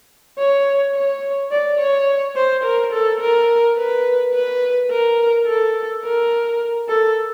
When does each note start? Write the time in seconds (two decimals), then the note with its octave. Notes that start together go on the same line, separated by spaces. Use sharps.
0.38 C#5
0.95 C#5
1.51 D5
1.79 C#5
2.36 C5
2.64 A#4
2.92 A4
3.21 A#4
3.77 B4
4.34 B4
4.90 A#4
5.47 A4
6.03 A#4
6.89 A4